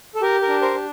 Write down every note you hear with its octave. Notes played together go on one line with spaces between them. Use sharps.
A4
G4 A#4
A#4
D4
A#4 C5
D4